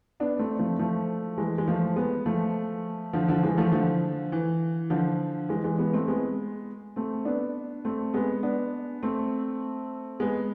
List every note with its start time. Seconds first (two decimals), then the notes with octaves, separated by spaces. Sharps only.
0.20 B3 D4
0.39 A3 C4
0.59 F3 A3
0.79 F3 A3
1.38 E3 G#3
1.58 G#3
1.68 F3 A3
1.96 G#3 B3
2.26 F3 A3
3.13 D3 F3
3.28 D3 F3
3.43 E3 G#3
3.58 F3 A3
3.72 D3 F3
4.32 E3
4.90 D3 F3
5.49 E3 G#3
5.64 E3 G#3
5.78 G#3 B3
5.94 A3 C4
6.08 G#3 B3
6.96 A3 C4
7.25 B3 D4
7.85 A3 C4
8.14 G#3 B3
8.43 B3 D4
9.03 A3 C4
10.20 G#3 B3